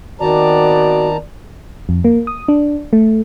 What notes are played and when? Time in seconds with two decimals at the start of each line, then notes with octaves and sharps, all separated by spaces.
0.20 D#3 B3 C4 F#4 D5 A5 A#5
1.89 F2
2.05 A#3
2.27 D#6
2.48 D4
2.93 A3